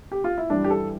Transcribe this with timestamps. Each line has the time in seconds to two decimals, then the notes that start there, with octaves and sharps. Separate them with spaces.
0.12 G4
0.24 F4
0.38 E4
0.50 G2 E3 G3 D4
0.64 G4
0.70 A4